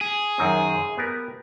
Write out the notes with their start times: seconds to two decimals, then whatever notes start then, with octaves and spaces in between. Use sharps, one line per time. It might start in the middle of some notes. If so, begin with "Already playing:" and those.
0.01 G#4
0.38 F#2 D#3 C4
0.97 B3 G4 A#4